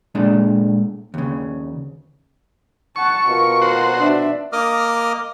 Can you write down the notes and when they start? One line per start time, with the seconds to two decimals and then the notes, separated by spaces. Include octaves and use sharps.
0.15 A#2 G#3 A3 D4
1.14 D#2 C#3
2.96 F#5 A5 C#6
3.28 B2 F4 A#4
3.61 F#4 C5
3.96 D4 E5
4.53 A#3 A#4 D#5 D6 D#6 F6